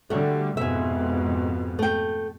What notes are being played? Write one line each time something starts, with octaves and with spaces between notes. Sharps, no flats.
D3 G3 A3 F#4
F2 G#2 B2 E5 G#5
A3 G5